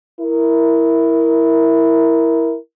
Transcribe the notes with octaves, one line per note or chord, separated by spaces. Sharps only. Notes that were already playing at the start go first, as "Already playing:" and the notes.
E4 A#4